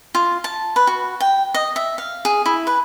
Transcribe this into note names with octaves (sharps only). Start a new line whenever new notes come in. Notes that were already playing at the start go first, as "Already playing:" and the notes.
F4
A5
B4
F#4
G5
D#5
E5
F5
G#4
E4
B4